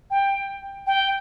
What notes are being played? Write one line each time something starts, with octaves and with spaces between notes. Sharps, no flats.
G5
G5